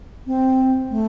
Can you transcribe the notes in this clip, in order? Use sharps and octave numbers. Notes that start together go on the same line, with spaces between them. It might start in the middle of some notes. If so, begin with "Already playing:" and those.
C4
A3